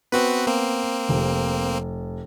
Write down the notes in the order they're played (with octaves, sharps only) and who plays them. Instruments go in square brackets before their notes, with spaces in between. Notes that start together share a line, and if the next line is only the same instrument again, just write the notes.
[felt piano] B3 [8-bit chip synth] C4 F#4 B4
[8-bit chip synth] A#3 C4
[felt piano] F1